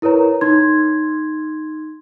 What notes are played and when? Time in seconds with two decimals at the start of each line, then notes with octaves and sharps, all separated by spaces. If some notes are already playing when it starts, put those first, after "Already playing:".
0.02 E4 A#4 B4 C#5 A#5
0.41 D#4 C6 G#6